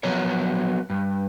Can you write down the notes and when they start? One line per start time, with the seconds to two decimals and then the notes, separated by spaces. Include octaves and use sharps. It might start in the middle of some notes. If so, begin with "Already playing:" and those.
0.03 F3 F#3 B3 A#4 C#5
0.90 G2